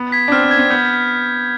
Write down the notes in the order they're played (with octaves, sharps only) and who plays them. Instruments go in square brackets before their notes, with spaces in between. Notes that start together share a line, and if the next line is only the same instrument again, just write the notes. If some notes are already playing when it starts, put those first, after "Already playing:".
Already playing: [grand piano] B3
[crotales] G#6 B6
[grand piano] D4
[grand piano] C4 [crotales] F6
[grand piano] C4
[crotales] G#6 B6
[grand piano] C4
[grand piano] B3 [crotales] G6